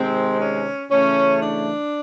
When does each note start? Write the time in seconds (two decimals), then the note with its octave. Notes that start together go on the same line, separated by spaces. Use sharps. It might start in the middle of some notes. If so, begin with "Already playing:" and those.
Already playing: C3 D#3 G#3 C4
0.39 C#4
0.90 C#3 E3 A3 C#4
1.41 D4